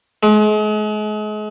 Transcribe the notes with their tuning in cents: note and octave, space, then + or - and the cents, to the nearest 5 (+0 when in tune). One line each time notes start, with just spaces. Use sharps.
G#3 +40